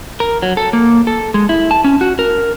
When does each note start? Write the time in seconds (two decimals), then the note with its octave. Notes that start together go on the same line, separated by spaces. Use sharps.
0.20 A#4
0.42 F#3
0.57 A4
0.73 A#3
1.07 A4
1.34 G#3
1.49 E4
1.71 A5
1.84 C#4
2.01 F#4
2.19 A#4